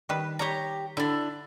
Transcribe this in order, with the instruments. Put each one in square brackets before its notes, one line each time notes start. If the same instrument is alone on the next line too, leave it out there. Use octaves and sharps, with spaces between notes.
[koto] D#3 G3 B4
[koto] G3 C#5 [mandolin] G4 A#5
[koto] D3 [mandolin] D4 E4